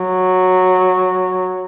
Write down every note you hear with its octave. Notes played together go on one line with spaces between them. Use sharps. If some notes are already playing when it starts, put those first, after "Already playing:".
Already playing: F#3